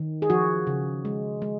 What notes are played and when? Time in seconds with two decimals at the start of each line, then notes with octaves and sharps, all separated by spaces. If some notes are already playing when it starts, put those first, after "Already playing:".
Already playing: D#3
0.22 G#4
0.30 F3 F#4
0.67 C#3
1.05 G#3
1.42 G#3